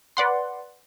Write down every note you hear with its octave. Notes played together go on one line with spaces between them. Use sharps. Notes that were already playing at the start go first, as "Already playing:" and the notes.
B4 D5 F#5 C6